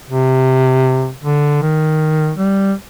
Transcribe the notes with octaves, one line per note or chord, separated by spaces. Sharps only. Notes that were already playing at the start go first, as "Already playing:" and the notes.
C3
D3
D#3
G3